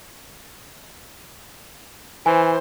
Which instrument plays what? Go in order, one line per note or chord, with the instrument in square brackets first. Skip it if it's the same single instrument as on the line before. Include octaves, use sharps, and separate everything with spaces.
[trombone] E3 [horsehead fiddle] C5 [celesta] G#5